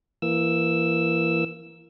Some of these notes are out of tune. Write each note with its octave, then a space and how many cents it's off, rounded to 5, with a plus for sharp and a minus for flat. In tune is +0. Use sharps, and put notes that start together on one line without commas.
E3 +20 A#3 +0 E6 +0